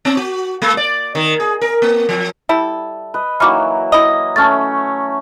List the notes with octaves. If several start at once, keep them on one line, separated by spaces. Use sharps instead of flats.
C4
F#4
G#3
D5
D#3
G#4
A#4
A#3
F3
G3 E4 A4
B4 D#5
E3 F#3 A#3 D#4 F#4 B5 D6 F6
E4 D#5
A3 C#4 A5 F6 A6